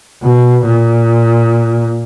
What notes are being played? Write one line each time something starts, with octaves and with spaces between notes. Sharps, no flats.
B2
A#2